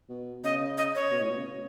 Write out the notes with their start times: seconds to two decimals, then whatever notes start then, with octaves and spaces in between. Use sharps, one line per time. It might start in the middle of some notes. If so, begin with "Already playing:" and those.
0.09 B2
0.44 C#3 D#5
0.78 D#5
0.95 C#5
1.11 B2
1.21 A2
1.29 B2
1.37 C#3